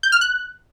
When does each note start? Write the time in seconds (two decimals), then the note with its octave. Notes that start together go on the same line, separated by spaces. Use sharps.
0.03 G6
0.12 F6
0.21 F#6